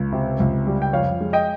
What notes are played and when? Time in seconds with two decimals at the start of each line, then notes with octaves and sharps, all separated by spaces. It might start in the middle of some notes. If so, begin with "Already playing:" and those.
Already playing: C#2
0.12 C3
0.40 C#2
0.67 G3
0.82 G5
0.93 F2 C#5 F5
1.21 G#3
1.33 D#5 G5